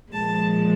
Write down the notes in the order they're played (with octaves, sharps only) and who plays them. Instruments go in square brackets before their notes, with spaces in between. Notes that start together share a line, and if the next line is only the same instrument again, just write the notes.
[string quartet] A#2 F3 G#3 A5